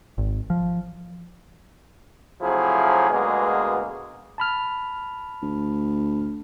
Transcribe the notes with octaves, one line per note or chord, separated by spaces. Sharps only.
G#1
F3
C3 F3 F#3 A3 E4 G#4
D2 B2 G#3 A#3 B3 G#4
A5 B5 F6
D2